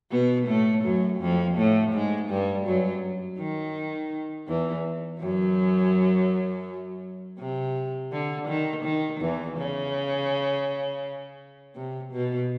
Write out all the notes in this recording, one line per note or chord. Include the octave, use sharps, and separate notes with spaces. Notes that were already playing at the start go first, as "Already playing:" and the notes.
B2 B3
A2 A3
F#2 F#3
F2 F3
A2 A3
G#2 G#3
G2 G3
F#2 F#3
D#3
E2 E3
F#2 F#3
C3
D3
D#3
D#3
E2 E3
C#3
C3
B2